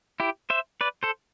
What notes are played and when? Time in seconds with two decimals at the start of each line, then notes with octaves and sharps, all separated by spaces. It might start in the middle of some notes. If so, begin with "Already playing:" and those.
0.20 E4 G4
0.50 C5 E5
0.81 B4 D5
1.03 A4 C5